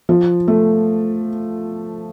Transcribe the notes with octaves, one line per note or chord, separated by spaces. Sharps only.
F3
A3